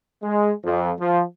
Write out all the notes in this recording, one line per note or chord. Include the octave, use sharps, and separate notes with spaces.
G#3
F2
F3